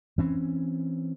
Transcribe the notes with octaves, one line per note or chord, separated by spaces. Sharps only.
E3 C4 C#4